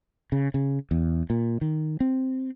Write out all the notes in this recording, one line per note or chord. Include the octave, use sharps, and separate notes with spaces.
C#3
C#3
E2
A#2
D#3
C4